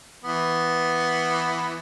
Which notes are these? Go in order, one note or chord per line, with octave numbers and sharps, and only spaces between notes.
E3 B3